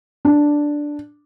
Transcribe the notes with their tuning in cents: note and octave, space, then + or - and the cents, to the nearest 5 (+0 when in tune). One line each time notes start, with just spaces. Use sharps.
D4 +0